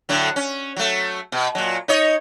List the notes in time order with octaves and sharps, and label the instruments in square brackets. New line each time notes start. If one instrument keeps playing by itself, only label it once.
[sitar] A2 D3 F#3
C#4
F#3 A3
B2
A#2 F#3
D#4 C#5 D#5